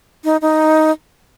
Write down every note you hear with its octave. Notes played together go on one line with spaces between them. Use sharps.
D#4
D#4